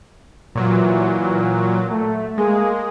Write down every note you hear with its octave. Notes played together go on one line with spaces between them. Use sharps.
A#2 E3 F#3
A3
G#3 A#3 G#4